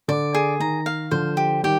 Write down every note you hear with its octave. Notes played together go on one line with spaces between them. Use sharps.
D3 D5
G#4
D#3 A#5
F5
D3 F3 C5
G4
D#3 G3 G4